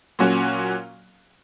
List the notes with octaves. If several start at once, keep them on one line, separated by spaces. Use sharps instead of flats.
A#2 F#3 C#4 F#4